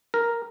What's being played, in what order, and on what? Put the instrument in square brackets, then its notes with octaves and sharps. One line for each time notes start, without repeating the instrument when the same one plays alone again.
[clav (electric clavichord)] A#4